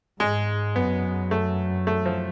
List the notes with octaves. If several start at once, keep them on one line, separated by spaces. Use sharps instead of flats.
G#2 G#3
F#2 B3
A3
A3
F3